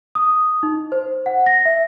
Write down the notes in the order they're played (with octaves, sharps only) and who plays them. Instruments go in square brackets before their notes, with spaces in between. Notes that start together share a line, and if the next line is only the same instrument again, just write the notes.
[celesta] D#6
D#4
C5
F#5
A#6
E5